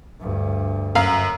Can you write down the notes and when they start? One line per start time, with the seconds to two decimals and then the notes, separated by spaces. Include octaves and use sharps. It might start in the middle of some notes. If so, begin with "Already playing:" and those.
0.21 D2 G2
0.95 F#2 F5